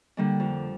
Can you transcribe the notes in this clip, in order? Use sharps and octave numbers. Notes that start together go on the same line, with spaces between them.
D3 G3 A#3 D4
F2